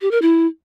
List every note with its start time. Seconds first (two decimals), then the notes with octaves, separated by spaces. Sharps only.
0.01 G4
0.11 A#4
0.22 E4